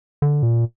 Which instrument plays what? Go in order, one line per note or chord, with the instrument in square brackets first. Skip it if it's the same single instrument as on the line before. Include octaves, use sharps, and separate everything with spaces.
[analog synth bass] D3
A#2